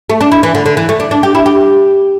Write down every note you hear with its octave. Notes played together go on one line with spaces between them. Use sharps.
A3
D4
E4
E3
D3
D3
E3
A3
D4
D4
G4
E4
G4